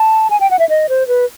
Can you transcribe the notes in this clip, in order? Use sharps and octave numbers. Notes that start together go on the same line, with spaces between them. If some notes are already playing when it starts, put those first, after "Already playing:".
Already playing: A5
G#5
G5
F#5
E5
D#5
C5
B4